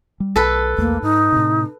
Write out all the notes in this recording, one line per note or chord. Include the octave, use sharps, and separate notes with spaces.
G3
B1 A4 B4
B1 E2 A3 A#3
G#2 D#4
A2 C3